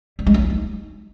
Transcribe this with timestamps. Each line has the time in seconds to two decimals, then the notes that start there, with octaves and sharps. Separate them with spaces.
0.19 G3
0.27 G#3
0.34 F#3
0.42 E4
0.50 D#4